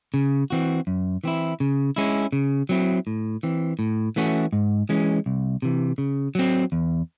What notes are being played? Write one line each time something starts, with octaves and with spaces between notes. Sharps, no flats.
C#3
E3 C4 F#4
F#2
E3 C4 E4
C#3
G#3 C#4 E4
C#3
F#3 C4 E4
A2
E3 C4
A2
E3 A3 C#4 F#4
G#2
E3 G#3 C#4
C2
C3 E3
C#3
F#3 C4
E2